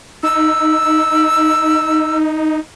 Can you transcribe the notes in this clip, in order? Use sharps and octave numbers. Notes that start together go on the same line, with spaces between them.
D#4 E6